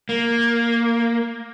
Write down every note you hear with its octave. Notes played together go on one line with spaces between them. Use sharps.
A#3